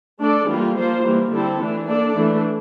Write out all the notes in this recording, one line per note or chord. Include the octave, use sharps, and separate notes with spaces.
A3 D4 A4 D5
E3 G3 A#3 F4
F3 A#3 F4 C5
E3 G3 A#3
D3 G3 C4 E4 A4
E3 A3 D4
A#3 D4 A4 D5
E3 A3 D4